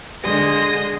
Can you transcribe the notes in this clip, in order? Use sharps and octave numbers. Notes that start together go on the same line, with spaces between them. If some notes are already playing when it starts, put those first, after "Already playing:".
D3 G#3 C6 D#6 A#6